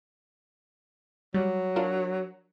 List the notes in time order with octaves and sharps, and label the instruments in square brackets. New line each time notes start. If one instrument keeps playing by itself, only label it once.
[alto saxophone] F#3 [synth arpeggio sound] G3
[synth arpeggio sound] D4 F4 A#4